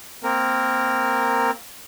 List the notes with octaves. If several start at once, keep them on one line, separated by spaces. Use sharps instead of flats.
A#3 C4 A#4